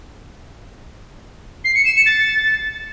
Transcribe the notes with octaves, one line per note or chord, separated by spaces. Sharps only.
C7
C#7
E7
C#7
A6